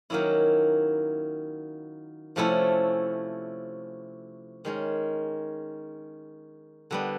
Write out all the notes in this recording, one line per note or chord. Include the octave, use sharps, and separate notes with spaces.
D#3 F#3 A#3 C#4 E4
C3 F3 A3 C#4 E4
D#3 G#3 C#4
D3 G3 B3